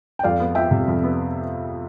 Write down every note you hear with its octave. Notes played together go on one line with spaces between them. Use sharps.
G5
F2 D5 F5
B3
F3 E5 G5
C3
F2
B3